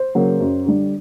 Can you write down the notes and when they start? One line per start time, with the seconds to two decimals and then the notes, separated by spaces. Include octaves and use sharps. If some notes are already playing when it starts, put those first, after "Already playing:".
Already playing: C5
0.15 C#3 F#3 A#3
0.40 F#2
0.66 D3 G3